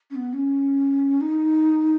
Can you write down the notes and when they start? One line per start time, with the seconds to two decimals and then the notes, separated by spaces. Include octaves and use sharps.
0.11 C#4
0.15 B3
0.33 C#4
1.21 D#4